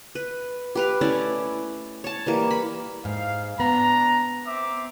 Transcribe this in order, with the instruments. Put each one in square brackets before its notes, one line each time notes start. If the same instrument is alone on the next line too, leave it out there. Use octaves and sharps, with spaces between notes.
[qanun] B4
G4 B4 F5
A3 C#4 E4 D5
C#5 A5
E3 G3 A#3
B5
[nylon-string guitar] G#2 [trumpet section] F5
[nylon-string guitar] B3 [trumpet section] D4 A#5
[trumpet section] C4 E5 D6